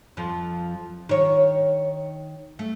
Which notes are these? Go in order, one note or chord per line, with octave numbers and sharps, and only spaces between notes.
F2 F3
D#3 C#5
A3